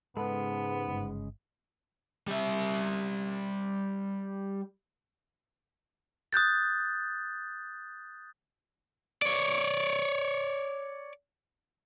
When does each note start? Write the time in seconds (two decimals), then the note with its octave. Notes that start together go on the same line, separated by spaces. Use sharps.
0.17 G#2 C#3 G#3 B3 A4 B4
0.88 G1
2.27 G3 E5
6.33 D#6 F#6 G6 A6
9.22 C#5 D5